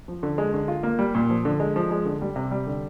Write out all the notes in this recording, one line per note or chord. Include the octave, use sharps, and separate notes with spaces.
F3
D3
G#3
D3
F4
A#3
G3
A#2
F3
D3
G#3
F3
G#3
D3
G3
C3
G3
D3